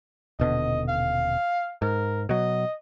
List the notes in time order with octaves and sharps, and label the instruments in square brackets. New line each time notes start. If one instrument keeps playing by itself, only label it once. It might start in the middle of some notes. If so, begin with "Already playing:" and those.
[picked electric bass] D#1 B2 D3 [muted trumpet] D#5
[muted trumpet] F5
[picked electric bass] G#2 [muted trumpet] A#4
[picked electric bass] B2 F#3 [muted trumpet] D#5